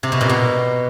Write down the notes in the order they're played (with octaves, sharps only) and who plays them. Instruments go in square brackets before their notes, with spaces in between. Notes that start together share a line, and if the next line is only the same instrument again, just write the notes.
[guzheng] C3
B2
A#2
B2